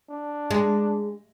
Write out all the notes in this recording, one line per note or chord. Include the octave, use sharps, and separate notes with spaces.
D4
G#3